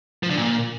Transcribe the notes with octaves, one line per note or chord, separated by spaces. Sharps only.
F3
D3
A#2